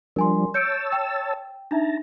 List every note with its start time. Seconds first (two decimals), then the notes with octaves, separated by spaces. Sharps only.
0.16 F3 G3 D4 A#4 G#5 C6
0.54 C#5 A5 E6 G6 C#7 D7
0.92 G5
1.71 D4 D#4 E5 A5 A#5